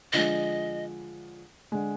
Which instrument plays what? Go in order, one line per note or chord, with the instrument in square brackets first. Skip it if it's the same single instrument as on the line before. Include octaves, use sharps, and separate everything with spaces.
[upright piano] D3 F3 G#3 [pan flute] D#5
[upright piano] D3 G#3